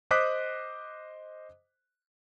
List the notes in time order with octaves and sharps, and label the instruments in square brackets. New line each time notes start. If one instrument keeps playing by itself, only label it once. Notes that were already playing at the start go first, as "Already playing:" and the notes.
[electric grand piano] C5 D#5 D6 D#6 F#6 B6